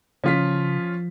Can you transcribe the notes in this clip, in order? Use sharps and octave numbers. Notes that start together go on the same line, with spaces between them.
C#3 F3 C#4 F4 B6